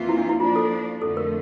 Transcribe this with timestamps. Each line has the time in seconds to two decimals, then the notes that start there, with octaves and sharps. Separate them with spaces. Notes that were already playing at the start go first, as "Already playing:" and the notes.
Already playing: F2 E3 A#3 F4
0.09 E4
0.18 D4
0.29 E4
0.40 F3 A#3 D4 F4
0.56 A4
1.02 F2 D3 A3 A4
1.17 A#4